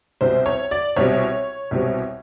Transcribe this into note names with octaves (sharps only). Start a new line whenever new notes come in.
C2 B2 G3 C4 C5
C#5
D5
C2 B2 G3 C4 C#5
C2 B2 G3 C4